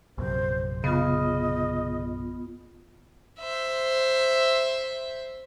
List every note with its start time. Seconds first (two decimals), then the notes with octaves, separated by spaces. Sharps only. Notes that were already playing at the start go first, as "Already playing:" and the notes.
0.18 A#1 F#2 C3 C5
0.84 C#3 B3 F4 D#5
3.40 C5 E5